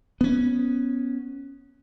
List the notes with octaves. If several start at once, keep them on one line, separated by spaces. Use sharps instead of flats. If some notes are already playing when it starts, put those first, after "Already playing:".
B3 C#4